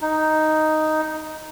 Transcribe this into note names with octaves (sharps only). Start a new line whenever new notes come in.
D#4